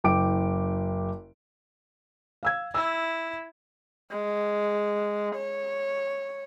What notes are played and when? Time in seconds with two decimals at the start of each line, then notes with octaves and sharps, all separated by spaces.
0.04 F#1 G5 D6 D7
2.43 F5 E6 G#6
2.74 E4 E6
4.11 G#3
5.35 C#5